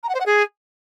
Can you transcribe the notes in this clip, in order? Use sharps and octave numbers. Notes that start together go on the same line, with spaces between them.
A#5
F#5
C5
F#5
G#4